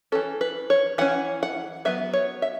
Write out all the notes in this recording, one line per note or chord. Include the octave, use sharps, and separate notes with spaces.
E3 C#4 A4
B4
C#5
E3 C#4 F#5
F#5
F#3 B3 E5
C#5
E5